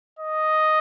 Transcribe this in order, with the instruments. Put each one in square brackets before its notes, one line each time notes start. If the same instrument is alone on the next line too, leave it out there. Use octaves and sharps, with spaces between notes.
[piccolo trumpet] D#5